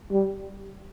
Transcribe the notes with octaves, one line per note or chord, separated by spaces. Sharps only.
G3